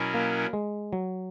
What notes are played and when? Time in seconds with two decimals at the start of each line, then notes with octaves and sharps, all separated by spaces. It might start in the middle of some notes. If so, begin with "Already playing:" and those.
Already playing: B2 F#3 C#4 E4 A#4
0.14 A#3
0.53 G#3
0.93 F#3